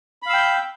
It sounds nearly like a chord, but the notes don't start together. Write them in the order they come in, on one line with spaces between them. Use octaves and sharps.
B5 F5 E6 G5 G6